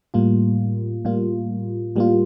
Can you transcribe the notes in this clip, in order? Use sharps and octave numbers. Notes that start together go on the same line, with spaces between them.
A2 G3 A#3 F4
A2 G3 A#3 F4
A2 G3 A#3 F4